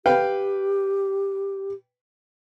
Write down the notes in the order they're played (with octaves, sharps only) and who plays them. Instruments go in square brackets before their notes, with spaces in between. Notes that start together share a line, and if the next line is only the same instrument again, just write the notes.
[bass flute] G4 [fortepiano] B4 F5 G5